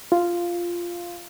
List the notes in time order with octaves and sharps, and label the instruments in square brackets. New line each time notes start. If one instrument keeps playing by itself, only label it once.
[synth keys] F4